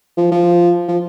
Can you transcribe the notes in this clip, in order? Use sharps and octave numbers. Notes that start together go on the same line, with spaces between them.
F3
F3
F3